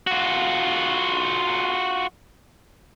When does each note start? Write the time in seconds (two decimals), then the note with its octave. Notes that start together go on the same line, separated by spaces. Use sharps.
0.07 F4 F#4